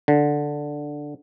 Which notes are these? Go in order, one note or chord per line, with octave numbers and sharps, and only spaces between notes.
D3